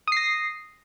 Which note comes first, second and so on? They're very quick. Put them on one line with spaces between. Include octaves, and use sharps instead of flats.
D#6 C7 A#6